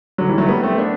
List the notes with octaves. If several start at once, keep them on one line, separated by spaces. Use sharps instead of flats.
D3 F#3
E3 G3
F#3 A3
G3 B3
A3 C4
B3 D4